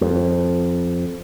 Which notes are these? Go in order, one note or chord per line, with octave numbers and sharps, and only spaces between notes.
F2